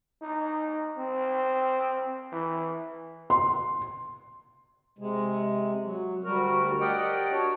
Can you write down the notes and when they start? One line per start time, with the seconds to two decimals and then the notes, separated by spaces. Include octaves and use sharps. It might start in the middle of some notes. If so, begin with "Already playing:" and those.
0.22 D#4
0.98 C4
2.32 E3
3.30 C6
4.99 C3 G#3
5.85 F#3
6.24 D2 G3 F#4 A#4
6.80 G4 A#4 D5 D#5 F#5 G5
7.31 D4 F#4 C#5